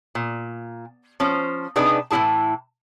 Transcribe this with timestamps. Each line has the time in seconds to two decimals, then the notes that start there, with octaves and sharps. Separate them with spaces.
0.15 A#2
1.20 F3 C#4 C5
1.76 C3 D4 D#4 G#4 B4
2.11 A2 E3 C#4 E4 G#4 A5